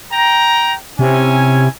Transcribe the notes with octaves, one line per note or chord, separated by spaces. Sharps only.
G5 A#5
C3 C#4 E4 G#5